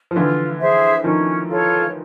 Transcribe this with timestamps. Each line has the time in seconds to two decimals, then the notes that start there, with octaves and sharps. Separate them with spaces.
0.11 F3
0.15 D3 E3 F4
0.60 G#4 C5 E5
1.04 D#3 F3 C#4
1.48 F4 A4 C#5